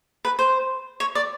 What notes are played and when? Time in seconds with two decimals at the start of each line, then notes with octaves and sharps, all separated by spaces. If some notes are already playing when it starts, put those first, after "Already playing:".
0.25 B4
0.39 C5
1.00 C#5
1.15 D5